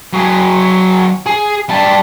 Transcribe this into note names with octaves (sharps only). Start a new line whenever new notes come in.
F#3 G#4
G#4
G3 A5